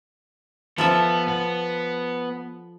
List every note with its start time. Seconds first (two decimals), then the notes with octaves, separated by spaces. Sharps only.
0.78 F3 B3 A4 E5
1.28 B3